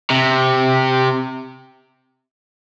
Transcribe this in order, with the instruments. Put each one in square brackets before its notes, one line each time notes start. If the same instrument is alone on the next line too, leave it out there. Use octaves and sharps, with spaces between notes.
[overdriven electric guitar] C3